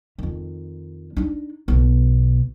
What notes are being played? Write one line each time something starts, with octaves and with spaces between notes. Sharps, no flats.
F2 D#3
D4 D#4
B1 B2